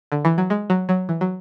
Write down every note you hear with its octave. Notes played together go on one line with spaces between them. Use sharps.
D3
E3
F#3
G#3
F#3
F#3
E3
F#3